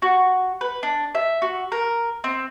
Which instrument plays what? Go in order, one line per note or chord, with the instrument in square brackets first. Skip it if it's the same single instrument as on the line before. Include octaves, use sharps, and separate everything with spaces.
[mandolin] F#4
B4
D4
E5
F#4
A#4
C4